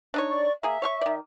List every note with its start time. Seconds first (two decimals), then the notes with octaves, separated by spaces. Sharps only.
0.14 D4 D#4 C#5
0.29 D5 C#6
0.63 A#3 G#4 E5
0.82 C#5 F5 C#6
1.01 D#3 D5